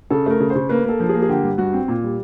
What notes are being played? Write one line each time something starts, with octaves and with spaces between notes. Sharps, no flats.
C#3 A4
A3 A#4
C#3
C5
C#3
A#3 B4
A#3 A4
F3
G#4
A#3
G#4
D3 G4
G2
G2 F#4
C4
A#2
G3